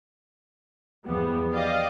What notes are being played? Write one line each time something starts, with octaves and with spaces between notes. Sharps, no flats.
E2 F3 G3 B3
G4 D5 D#5 F5